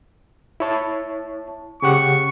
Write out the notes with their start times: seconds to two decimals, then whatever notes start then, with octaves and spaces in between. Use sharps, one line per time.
0.60 E4 C#5 A5
1.82 C#3 G4 F#5 C#6